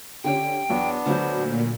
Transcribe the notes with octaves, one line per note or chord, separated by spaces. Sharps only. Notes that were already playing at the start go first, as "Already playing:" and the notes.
D3 C#4 G4 G5
E2 F#3 B3 D4
D2 F#3 C5
A#2